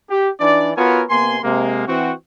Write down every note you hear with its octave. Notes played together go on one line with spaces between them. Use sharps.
G4
E3 D4 D#4 D5
B3 F4 F#4 A#4 C#5 G#5
C3 A#3 B3 G#5 C6
C3 G#3 A#3
E3 C4 F#4